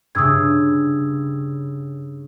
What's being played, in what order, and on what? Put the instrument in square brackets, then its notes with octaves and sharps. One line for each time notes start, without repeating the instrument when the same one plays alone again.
[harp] G2 C#3 [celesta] D#6 E6 G#6